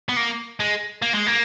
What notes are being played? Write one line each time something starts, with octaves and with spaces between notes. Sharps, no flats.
B3
A#3
G#3
A#3
G#3
A#3